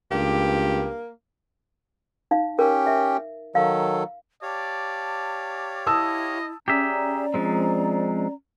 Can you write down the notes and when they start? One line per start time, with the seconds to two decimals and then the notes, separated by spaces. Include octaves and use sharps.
0.11 C#2 G2 A#3 G4
2.31 D#4 F5
2.59 C#4 G4 A#4 G5
2.87 E5
3.55 D#3 F#3 A4 F5
4.42 G4 C#5 D5 F5 A5
5.87 E4 D#5 A5 D#6 E6
6.68 C#4 G4 G#4 D5 E5 A#5
7.34 F3 G#3 C4